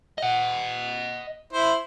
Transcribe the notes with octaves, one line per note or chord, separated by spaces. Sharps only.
D#5 F#5
E4 C5